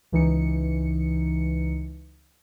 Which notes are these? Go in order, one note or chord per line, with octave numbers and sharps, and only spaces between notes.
C#2 E3 D#4 C#7